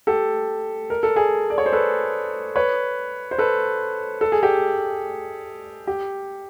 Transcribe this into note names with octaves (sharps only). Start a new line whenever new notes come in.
G4 A4
A#4
A4
G#4 A#4
D5
C#5
C5
A4 B4
B4 C#5
C5
A4 B4
A4
G#4
G4 A4
G4